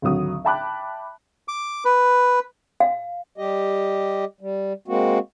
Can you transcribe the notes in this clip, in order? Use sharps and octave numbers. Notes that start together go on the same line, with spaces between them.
G#1 D2 F#3 D#6
E5 G5 A5 B5 D6 F#6
D6
B4
F5
G3 G4 D#5
G3
G#3 A#3 C4 F#4